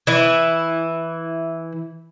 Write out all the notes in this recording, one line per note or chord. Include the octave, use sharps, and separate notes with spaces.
E3 E4